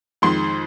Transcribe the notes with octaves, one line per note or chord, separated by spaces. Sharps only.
F2 D#3 G#3 C6